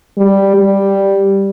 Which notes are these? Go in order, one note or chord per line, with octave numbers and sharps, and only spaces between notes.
G3
G3